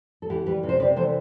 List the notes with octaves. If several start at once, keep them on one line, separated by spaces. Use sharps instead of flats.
A4
E3 E4 G4
G3 G4 B4
C3
C5
C3 B4 D5
E3 A4 C5